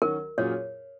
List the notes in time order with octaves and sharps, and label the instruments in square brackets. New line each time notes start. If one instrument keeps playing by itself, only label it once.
[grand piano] D#3 F#3 C#4 F#4 [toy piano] A#4
[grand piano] A#2 F#3 C#4 F4 G#4 [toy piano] C#5